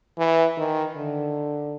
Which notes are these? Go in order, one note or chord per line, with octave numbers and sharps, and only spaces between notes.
E3
D#3
D3